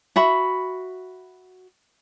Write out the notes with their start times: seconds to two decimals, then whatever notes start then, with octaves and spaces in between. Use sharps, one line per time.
0.16 F#4 E5 B5